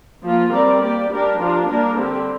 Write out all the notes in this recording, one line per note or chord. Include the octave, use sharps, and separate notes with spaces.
F3 A#3 F4
G3 C4 A#4 D5
A#3 G4 D5
G3 D4 G4 A#4
F3 D4 F4 A#4
G3 A#3 D4 A#4
D3 G3 C4 G4